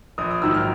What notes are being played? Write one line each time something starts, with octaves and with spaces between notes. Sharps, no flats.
A#1 D#6
D#6
G#2 D#3 F#3 E6
F6